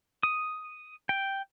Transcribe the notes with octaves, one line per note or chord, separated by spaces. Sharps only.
D#6
G5